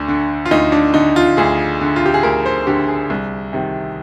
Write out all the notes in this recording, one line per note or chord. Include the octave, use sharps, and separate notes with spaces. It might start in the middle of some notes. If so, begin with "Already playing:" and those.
Already playing: D2 D4
D3
F4
D2 D#4
D4
D3 D#4
F4
D2 G#4
D3
F4
G4
G#4
D2 A#4
C5
D3 G4
G#4
C2
C3 D#3